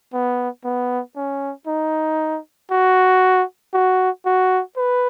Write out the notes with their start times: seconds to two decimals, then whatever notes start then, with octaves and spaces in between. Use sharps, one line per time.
0.13 B3
0.65 B3
1.16 C#4
1.67 D#4
2.71 F#4
3.74 F#4
4.26 F#4
4.77 B4